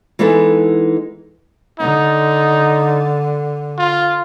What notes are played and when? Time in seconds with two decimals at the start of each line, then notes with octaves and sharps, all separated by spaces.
0.19 E3 G#3 B3 D#4 E4 A4
1.80 D3 D#4
3.78 F4